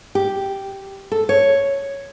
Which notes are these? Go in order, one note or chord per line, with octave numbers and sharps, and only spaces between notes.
G4
A4
C#5